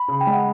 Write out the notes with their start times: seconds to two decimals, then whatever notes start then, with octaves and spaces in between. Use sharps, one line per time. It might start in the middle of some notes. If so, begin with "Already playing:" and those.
Already playing: B5
0.08 C#3
0.21 G5
0.27 G#3
0.33 F#5